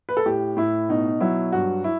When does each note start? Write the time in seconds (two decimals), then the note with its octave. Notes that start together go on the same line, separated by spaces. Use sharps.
0.09 B4
0.17 A4
0.26 A2 G4
0.57 A2 E4
0.89 B2 D#4
1.20 F#3 E4
1.52 G2 F#4
1.84 E4